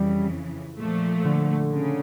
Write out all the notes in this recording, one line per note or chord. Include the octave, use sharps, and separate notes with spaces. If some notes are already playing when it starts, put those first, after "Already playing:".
Already playing: F2 C#3 E3 G3
A#2 F3 A3
D3
C#3